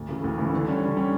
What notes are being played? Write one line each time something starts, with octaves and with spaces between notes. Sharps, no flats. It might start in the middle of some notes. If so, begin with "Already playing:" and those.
Already playing: D2
C#3 E3 A3
D2
C#3 E3 A3
D3
G3 C#4
D3
G3 C#4